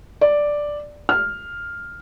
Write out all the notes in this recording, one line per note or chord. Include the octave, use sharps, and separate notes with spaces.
D5
F6